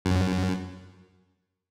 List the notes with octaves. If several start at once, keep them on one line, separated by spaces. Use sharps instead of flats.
F#2